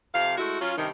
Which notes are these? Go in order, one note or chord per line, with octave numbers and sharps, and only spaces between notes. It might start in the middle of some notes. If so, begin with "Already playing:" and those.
F2 C3 F5
G#3 A3 E4 F#4
F#3 C#4 F4
G2 C3 D#3